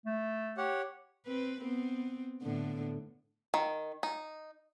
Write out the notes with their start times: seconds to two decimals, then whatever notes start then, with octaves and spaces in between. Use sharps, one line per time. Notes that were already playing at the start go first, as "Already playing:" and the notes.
0.06 A3
0.57 G4 C#5 F#5
1.26 C4 B4
1.61 B3 C4
2.42 A2 D3 B3
3.54 D#3
4.03 D#4